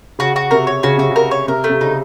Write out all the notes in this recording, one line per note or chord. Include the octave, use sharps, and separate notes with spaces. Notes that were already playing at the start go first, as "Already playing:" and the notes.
C#3 F#4
F#4
C3 A#4
C#5
C#3 F#4
C3 F#4
C#3
A#4
C#5
C3 A#4
A3
C3
C#3 D#4